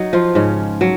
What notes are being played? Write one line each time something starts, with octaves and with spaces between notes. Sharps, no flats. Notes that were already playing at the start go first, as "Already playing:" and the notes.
Already playing: F#3 D#4 D#5
F3 F4
G#2 C#3 C#4
F#3